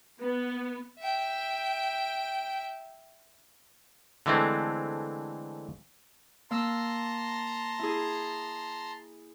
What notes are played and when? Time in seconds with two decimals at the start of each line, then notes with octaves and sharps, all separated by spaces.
0.20 B3
0.99 E5 G5
4.26 D3 E3 G#3 A3 C4
6.51 A#3 A5 A#5 C6 E6
7.79 E4 G#4